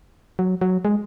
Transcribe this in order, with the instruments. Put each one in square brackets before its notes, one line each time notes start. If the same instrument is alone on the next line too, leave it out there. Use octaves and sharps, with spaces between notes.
[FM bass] F#3
F#3
G#3